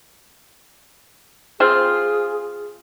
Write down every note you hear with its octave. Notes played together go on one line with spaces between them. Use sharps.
C4 F4 G#4